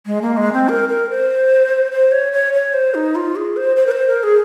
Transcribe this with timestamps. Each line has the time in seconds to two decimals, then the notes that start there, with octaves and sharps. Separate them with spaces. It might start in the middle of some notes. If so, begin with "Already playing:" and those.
0.06 G#3
0.22 A#3
0.37 G#3
0.53 C4
0.69 A#4
0.89 A#4
1.10 C5
1.92 C5
2.12 C#5
2.33 C#5
2.53 C#5
2.74 C5
2.94 D#4
3.15 F4
3.36 G#4
3.57 C5
3.76 C5
3.86 A#4
3.91 C5
4.08 A#4
4.23 G#4